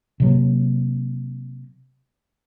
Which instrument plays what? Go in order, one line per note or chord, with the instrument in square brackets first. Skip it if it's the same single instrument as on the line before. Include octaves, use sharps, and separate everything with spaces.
[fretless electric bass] C3 F#3 A#3